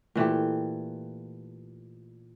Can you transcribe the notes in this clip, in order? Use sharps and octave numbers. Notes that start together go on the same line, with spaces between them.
A#2 E3 A3 G4